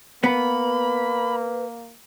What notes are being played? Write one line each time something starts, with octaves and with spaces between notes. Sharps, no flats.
A#3 B3 B4 B5